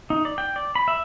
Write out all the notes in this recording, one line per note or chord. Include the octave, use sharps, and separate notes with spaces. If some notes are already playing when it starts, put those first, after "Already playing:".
D#4
D5
G5
D5
B5
E5